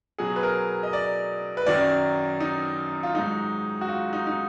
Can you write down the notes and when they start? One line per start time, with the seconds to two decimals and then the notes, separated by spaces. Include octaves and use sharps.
0.18 B2 F#3 G#4
0.36 B4
0.43 A#4
0.83 D#5
0.93 D5
1.57 B4
1.66 F#2 D#3 F#3 D5
2.40 D#4
3.03 F4
3.15 G#2 F#3 D#4
3.81 F#4
3.89 F4
4.13 D#4
4.27 D#4